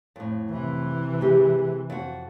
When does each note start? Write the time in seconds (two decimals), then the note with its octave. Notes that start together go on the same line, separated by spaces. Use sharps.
0.16 F2 A2
0.51 C3 E3
1.21 G#3 G4
1.90 F2 F#4